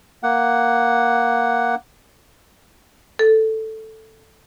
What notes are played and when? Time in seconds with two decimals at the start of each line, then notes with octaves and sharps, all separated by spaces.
0.23 A#3 F#5
3.19 A4